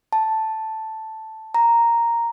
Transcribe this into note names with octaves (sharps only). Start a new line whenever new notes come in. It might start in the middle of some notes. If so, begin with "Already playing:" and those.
A5
A#5